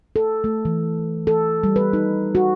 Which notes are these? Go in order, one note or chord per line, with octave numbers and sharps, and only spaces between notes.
A4
A3
E3
A4
G3
B4
D#4
F#4